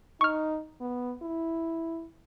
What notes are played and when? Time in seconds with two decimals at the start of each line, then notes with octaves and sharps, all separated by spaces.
0.21 D#4 C#6 F6
0.81 B3
1.22 E4